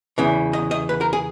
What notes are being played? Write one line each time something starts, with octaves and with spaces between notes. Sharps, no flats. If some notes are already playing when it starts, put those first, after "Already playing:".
E2 C#3 E3
D#5
D#5
B4
A#4
G#4